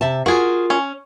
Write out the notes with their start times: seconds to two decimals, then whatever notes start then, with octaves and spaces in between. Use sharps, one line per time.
0.01 C3 E5 A5
0.26 F4 F#4 G#4 A#4
0.70 C#4